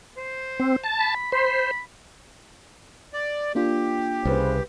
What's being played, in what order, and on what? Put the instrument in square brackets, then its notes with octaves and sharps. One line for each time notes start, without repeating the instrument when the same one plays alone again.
[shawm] C5
[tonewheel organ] C4
A5
[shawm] B5
[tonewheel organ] C5 [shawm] B5
[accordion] D5
[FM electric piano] A#3 D4 F4 [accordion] G4
[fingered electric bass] C2 [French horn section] C#3 B4 C5